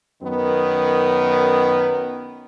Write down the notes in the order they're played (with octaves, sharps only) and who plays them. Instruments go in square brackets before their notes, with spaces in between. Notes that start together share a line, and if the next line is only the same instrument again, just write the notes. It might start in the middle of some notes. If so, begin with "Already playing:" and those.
[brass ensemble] F#2 D#3 B3